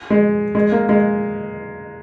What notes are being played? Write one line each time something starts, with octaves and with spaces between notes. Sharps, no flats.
G#3
G#3
A#3
G#3